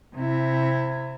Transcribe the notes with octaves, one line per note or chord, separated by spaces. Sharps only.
C3 E4